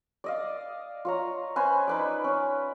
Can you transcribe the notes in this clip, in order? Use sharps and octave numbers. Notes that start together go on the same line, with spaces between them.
D5 D#5 F5
F4 C#5 A#5
C#4 B4 C5 G#5
D#4 B4 D5
C#4